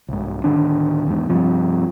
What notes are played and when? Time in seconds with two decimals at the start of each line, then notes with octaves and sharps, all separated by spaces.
0.09 C2 G#2
0.44 D1 D#2 D#3 D4
1.07 E2 G#2
1.29 G2 C3 F3